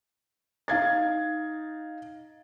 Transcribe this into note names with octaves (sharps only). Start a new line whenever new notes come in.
D#4 F5 G#6 A6